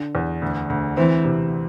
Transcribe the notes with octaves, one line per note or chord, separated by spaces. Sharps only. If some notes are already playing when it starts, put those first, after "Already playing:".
Already playing: D3
E2
D2
D2
E3 C4
C3